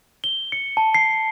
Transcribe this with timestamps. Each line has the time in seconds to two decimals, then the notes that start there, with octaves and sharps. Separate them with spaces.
0.24 G7
0.52 C#7
0.77 A5
0.94 C7